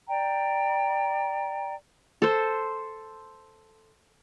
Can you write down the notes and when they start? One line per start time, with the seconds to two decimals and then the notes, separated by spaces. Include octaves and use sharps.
0.08 D5 G5 A#5
2.22 A4 C5